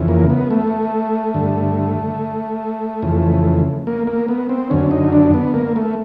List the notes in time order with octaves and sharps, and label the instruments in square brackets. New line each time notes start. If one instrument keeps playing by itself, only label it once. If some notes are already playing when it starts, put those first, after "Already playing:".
Already playing: [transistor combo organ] F2 C#3 E3
A#3
B3
A3
G2 D3
F2 C#3 E3
A#3
A#3
B3
C4
F#2 D3 C#4
D#4
D4
B3
A#3
A3